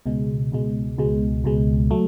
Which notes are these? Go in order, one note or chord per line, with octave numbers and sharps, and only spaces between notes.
C#2 B2 G#3
C#2 B2 G#3
C#2 B2 G#3
C#2 B2 G#3
F#3 A3